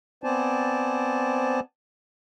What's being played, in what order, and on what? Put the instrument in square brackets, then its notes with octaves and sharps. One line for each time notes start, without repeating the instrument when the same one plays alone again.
[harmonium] B3 C4 C5 D5 G#5 A5